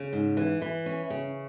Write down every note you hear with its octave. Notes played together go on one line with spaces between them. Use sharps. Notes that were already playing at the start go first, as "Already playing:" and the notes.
Already playing: C#3
G#2
E3
E3
C#4
C#3